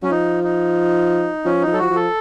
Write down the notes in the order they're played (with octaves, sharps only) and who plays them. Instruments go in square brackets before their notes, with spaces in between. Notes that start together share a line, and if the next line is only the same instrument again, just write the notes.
[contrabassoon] F#3 [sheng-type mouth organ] C#4
[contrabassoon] F3 [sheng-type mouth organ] D#4
[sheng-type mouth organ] D#4
[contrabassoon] F3 [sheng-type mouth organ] C#4
[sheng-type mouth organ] D#4
[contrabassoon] F3
[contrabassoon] F#3 [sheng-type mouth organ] A4
[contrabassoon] F3 [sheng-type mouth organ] F#4
[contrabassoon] F3
[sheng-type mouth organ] A4